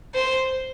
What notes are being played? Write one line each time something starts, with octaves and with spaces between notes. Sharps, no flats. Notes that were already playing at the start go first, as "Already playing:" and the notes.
C5